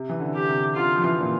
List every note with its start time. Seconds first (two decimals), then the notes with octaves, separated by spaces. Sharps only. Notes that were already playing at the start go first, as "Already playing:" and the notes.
Already playing: C3
0.09 E3
0.20 D3
0.35 G4
0.48 C3
0.75 D3 F4
0.96 F3
1.04 E3
1.20 A#2